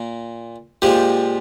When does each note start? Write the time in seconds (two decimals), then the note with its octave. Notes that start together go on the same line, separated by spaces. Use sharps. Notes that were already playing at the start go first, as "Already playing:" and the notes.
Already playing: A#2 A#3
0.82 A#2 F3 G#3 G4